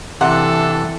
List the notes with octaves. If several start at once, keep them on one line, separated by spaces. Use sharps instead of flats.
C3 E3 D4 A4 F#5